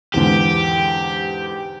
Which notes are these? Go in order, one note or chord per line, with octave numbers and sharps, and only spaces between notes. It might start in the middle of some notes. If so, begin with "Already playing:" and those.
E2 G#2 D3 G4